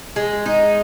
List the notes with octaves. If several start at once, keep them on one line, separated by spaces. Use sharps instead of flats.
G#3
D#4